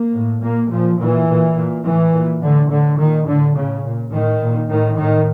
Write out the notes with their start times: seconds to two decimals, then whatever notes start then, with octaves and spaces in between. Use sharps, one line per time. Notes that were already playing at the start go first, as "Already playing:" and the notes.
Already playing: A#3
0.13 A2
0.42 A#2 A#3
0.70 A#2 F3
0.99 A#2 E3
1.27 A#2
1.56 A#2
1.85 A2 E3
2.13 A#2
2.41 A2 D3
2.70 A2 D3
2.99 A#2 D#3
3.27 A2 D3
3.55 A2 C#3
3.85 A#2
4.12 A2 D#3
4.41 A#2
4.70 A2 D#3
4.98 A2 D#3